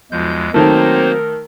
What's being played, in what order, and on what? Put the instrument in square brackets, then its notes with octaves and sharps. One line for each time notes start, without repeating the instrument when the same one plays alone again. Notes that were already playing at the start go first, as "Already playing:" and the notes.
[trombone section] B1 F3 [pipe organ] E2 G#3 G6
[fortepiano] D#3 A3 [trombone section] F#3 C4 [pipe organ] A#3 D#4 C5 [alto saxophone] A#4